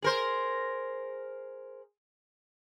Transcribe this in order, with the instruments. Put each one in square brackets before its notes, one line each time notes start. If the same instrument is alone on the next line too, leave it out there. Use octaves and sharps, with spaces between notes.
[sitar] G#4 A#4 C5